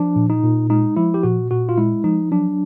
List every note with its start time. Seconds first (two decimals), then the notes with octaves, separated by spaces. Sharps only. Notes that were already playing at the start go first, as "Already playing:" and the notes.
Already playing: F3 D4
0.16 A#2
0.30 D#4
0.43 A#2
0.70 G#3 D#4
0.97 F3 E4
1.14 G4
1.23 A#2 F#4
1.51 A#2 F#4
1.69 F4
1.78 G#3 E4
2.04 F3 D#4
2.31 F#3 D4